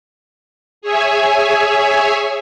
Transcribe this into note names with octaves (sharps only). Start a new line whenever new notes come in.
G#4 C#5 E5 G#5